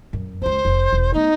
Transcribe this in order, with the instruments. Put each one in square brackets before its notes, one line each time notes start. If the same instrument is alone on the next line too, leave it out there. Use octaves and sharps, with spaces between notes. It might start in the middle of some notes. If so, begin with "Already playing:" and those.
[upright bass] F#2
[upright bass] C#2 C#4 [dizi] C5
[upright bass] F1
E1
[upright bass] A3 B3 [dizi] D#4